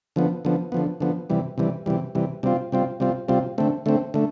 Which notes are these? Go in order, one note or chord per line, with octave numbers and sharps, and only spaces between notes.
D3 F3 B3
D3 F3 B3
D3 F3 B3
D3 F3 B3
C3 E3 G3
C3 E3 G3
C3 E3 G3
C3 E3 G3
C3 G3 C4 F4
C3 G3 C4 F4
C3 G3 C4 F4
C3 G3 C4 F4
D3 A3 C4
D3 A3 C4
D3 A3